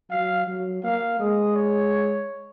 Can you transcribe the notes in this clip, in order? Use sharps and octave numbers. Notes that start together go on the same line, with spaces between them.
F#3 F5
F#3
A#3 F5
G#3 D#5
C#5